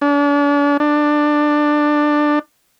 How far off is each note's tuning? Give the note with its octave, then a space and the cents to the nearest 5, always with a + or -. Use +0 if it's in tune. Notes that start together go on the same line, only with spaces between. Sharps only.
D4 -40
D4 +15